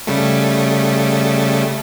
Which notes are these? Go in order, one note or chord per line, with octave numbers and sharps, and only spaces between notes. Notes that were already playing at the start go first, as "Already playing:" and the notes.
C#3 G3 A3